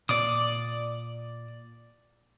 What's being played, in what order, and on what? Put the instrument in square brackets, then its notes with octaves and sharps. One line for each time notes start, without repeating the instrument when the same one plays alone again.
[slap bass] A#2 [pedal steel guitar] D5 D6 D#6